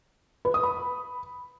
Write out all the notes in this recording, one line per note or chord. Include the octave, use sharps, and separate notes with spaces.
B4
D#6
B5